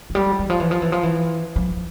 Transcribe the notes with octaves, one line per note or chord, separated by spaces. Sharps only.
F3
G3
E3
F3
E3
F3
E3
F3
E3
F3